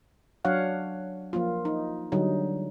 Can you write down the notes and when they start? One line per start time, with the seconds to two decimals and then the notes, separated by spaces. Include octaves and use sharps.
0.45 F#3 D4 C#5 F5 F#5
1.33 F3 A#3 F4
1.65 D#4
2.12 D3 F#3 G3 D#4